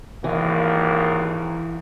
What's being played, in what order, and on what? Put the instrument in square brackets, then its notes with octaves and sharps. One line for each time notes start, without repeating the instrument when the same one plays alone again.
[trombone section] G#1 D#2 A#3 [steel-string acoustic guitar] E3